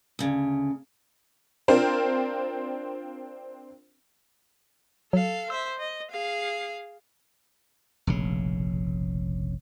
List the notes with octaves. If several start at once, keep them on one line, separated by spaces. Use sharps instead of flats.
D2 C#3
C4 D4 F4 A#4 C5
F#3 A4 F5
C5 E5 E6
D#5
G#4 F5
F1 A#1 C#3